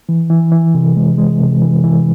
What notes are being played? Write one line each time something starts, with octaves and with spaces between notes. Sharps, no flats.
E3
E3
E3
C3
G#3
G#3
C3
E3
E3